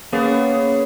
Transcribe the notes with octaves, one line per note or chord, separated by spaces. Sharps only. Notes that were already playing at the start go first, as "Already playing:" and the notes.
A#3 B3 C#4 G#4